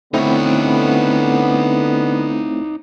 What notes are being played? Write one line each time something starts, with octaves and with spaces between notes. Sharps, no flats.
D3 A3 B3 C4 D#4 E4 C#5